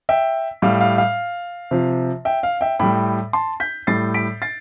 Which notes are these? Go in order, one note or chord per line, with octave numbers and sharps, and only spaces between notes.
E5 G5
A2 G3 F5
F5
F5
C3 F3
E5 G5
F5
E5 G5
A2 G3 G5 B5
A5 C6
G6 B6
A2 G3 A6 C7
B6 D7
A6 C7